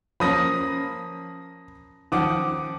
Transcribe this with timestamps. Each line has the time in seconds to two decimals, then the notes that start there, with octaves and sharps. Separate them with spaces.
0.20 F3 A#3 C#4 B5 D#6 A#6
2.12 D#3 F3 F#5 D6 D#6